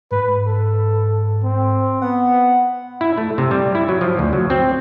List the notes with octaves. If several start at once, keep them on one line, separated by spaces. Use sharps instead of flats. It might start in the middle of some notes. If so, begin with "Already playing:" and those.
G#2 B4
A4
C4
B3 F#5
E4
A3
C3
G3
E4
F#3
F3
D2
F#3
C4